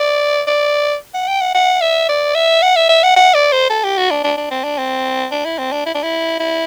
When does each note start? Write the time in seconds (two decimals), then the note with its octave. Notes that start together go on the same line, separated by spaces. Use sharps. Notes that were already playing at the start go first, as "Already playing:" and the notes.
Already playing: D5
0.47 D5
1.14 F#5
1.28 G5
1.41 F#5
1.55 F#5
1.81 E5
2.09 D5
2.35 E5
2.62 F#5
2.76 E5
2.89 E5
3.03 F#5
3.16 F#5
3.34 D5
3.53 C5
3.70 A4
3.84 G4
3.98 F#4
4.11 D4
4.24 D4
4.37 D4
4.51 C4
4.64 D4
4.78 C4
5.32 D4
5.45 E4
5.59 C4
5.72 D4
5.86 E4
5.95 D4
6.03 E4
6.40 E4